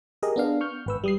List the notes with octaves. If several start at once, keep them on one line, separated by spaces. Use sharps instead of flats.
G4 G#4 A#4 D#5
B3 D4 F5
C#6 F6 G6
G#1 B4 E6
G3 D#6 C7